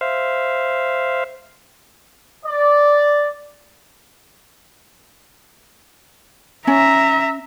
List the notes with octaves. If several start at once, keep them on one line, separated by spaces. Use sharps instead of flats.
C5 E5 F5
D5
C#4 E5 A#5